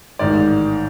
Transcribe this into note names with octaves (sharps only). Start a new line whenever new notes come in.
A1 G#2 D#3 D5